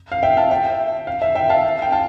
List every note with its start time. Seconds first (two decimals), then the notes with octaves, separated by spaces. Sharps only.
0.12 F5
0.23 E5 G5
0.37 F5 A5
0.51 E5 G5
1.07 F5
1.22 E5
1.35 E5 G5
1.49 F5 A5
1.82 G5
1.92 F5 A5